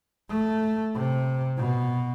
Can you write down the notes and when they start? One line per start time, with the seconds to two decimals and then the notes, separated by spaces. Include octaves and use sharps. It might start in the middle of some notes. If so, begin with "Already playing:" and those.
0.29 A3
0.95 C3
1.58 B2